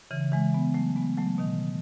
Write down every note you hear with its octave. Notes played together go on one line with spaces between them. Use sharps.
C#3 E3
E3 G#3
G#3 B3
F#3 A3
G#3 B3
F#3 A3
B2 D#3